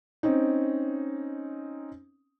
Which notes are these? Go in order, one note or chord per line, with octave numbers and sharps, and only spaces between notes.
C4 C#4 D#4